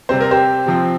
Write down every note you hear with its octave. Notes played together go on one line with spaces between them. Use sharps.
C3 G3 C4 C5
A#4
G4 C5
C3 F3 C4